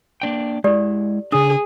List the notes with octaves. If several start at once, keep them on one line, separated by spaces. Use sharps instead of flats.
A#3 D4 G5
G#3 E4 G4 A4 D5
C#3 D4 G#4 D#6